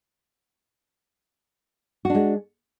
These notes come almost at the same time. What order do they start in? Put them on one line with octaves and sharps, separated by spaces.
F#4 D4 G#3